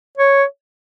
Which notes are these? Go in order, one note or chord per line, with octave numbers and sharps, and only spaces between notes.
C#5